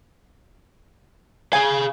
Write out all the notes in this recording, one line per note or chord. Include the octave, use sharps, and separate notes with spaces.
G#4 F5 G#5